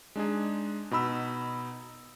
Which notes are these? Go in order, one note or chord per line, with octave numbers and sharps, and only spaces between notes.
G#3 D4 D#4 G#4
B2 D#4 B5 E6